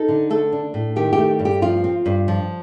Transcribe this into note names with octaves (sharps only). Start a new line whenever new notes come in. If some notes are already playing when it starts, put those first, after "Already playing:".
Already playing: D#4 A4
D3
A3 A4
D4
A2
D#3 G4
G4
A3
G2
G4
F3 F4
C4
G2
F3